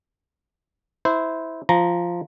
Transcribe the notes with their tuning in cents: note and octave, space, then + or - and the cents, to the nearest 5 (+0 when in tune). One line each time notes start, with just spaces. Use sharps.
E4 -15 C5 -20
F3 -5 A#5 +0